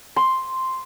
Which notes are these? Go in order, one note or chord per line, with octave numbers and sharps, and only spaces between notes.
C6